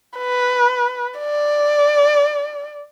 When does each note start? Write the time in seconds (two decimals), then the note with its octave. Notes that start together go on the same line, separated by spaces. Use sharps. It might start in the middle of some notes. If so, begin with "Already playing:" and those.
0.18 B4
1.20 D5